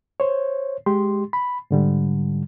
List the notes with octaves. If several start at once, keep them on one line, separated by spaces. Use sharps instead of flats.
C5 C#5
G#3 G4 C6
B5
G#2 D3 G3